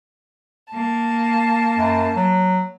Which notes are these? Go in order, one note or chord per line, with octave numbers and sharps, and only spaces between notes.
A#3 A5
F#2
F#3